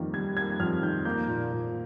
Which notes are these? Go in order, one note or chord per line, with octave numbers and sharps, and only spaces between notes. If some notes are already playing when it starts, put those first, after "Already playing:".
Already playing: F2 D#3 G3 A#3
G3 G#6
A#3 G#6
F2 F6
D#3 G6
A#3 G6
A#2
A#2